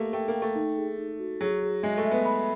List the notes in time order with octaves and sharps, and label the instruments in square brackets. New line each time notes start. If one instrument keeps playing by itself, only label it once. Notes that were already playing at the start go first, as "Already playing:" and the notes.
Already playing: [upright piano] A3 A#3 [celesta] G4
[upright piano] A3 [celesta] G5
[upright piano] A#3
[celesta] G5
[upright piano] A3
[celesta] D#4
G#4
D#4
F#4
[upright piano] F#3 [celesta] G#4
[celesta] G#4
[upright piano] G#3 [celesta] E5
[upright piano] A3
[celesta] E5
[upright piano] B3
[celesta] B5